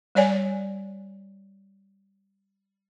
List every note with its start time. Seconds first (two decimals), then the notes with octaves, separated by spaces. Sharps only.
0.15 G3 C#5 D5 G#5